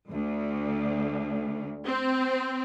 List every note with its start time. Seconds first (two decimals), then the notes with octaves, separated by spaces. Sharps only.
0.11 D2
1.85 C4